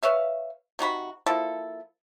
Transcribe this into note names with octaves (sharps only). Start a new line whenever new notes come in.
B4 C#5 E5 F5
C3 D#4 F#4 B5
F3 A#3 E4 A4